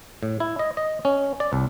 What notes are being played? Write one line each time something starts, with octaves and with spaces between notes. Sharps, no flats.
A2
E4
D#5
D#5
C#4
D5
C2